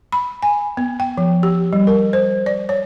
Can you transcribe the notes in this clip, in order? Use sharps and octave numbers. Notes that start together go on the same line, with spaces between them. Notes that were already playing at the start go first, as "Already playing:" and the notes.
B5
G#5
B3
G5
F3
G4
G3
A#4
C5
D5
C#5